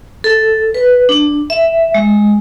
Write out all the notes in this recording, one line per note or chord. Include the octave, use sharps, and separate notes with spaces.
A4
B4
D4
E5
G#3